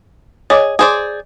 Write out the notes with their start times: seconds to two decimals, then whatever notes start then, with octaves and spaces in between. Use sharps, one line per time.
0.50 G#4 C#5 D#5 D6
0.79 G#4 C5 D5